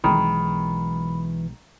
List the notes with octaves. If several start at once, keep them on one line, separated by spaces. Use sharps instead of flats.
B1 D#3 E3 G#3 B5